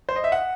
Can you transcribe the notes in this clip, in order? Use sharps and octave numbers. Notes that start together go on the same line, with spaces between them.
C5
D#5
E5
F#5